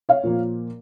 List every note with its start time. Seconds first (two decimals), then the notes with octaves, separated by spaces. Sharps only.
0.09 C#5 F5
0.23 A#2 F3 A#3